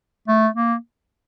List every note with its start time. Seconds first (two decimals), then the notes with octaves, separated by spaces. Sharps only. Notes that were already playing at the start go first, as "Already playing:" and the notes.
0.28 A3
0.55 A#3